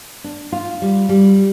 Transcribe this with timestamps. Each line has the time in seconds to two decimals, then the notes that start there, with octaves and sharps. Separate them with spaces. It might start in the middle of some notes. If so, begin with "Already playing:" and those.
0.24 D4
0.52 F4
0.82 G3
1.09 G3